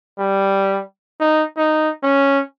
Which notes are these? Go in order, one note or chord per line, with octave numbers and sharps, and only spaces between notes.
G3
D#4
D#4
C#4